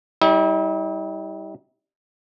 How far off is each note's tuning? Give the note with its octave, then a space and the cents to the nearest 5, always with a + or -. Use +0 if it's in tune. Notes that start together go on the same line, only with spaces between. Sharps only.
G3 +0 E4 -45